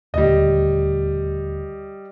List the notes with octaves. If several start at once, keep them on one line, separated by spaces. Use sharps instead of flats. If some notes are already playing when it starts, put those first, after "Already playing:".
D#1 D2 G3 D#5